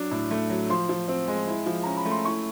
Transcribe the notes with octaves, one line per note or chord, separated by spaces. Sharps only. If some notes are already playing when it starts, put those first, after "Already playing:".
Already playing: F#3 D4
A2
A3
F#3
F3 C6
F3
C4
G#3
E4
F3
C#4 A#5
B5
A3
C6
E4 C#6